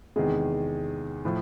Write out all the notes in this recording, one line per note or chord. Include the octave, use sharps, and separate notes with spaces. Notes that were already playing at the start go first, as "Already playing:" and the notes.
E2 C3 D#3 G#3 G#4
A2 F3